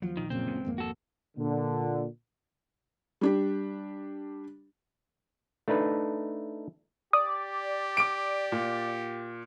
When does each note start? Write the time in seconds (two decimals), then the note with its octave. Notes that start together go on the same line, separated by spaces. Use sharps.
0.02 D#2 F3 F#3
0.17 A#1 D#3
0.30 F#2 A#2 C#3 C4
0.46 D2 G#3 B3
0.65 G#1 F2 A#3
0.78 F#4 A4
1.37 A#2 D3
3.21 G3 D4 G4
5.68 A3 D4 D#4 B4
7.13 G4 D5 D#6
7.97 D6 D7
8.52 A#2